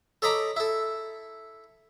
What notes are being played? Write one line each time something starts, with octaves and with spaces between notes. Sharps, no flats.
A4 C#5 D#5 A#5 B5 D6
E4 A4